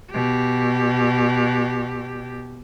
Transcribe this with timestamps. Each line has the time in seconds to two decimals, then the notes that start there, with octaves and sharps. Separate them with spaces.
0.11 B2 G4